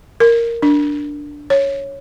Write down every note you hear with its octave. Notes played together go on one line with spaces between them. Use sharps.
A#4
D4
C#5